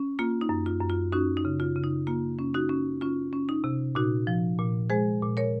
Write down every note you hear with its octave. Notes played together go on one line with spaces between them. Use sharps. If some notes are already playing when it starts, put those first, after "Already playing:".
Already playing: C#4
A#3 F4
D#4
F#2
F4
F#2
F4
C#4 D#4 F#4
D#4
C#3
F4
C#3
D#4
A#3 F4
C#4
D#4 F#4
C#4
C#4 F4
C#4
D#4
C3
A#2 D#4 F#4
F3
A#2
G#3 G#4 C5
A#2
A#4 C#5